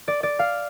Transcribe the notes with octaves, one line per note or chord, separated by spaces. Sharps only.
D5
D5
F5